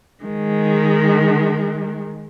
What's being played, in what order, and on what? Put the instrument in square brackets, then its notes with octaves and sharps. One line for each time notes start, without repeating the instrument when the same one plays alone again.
[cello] D#3 G#3